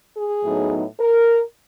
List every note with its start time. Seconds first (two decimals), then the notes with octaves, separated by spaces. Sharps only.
0.15 G#4
0.43 A2 F#3 B3 D#4
0.99 A#4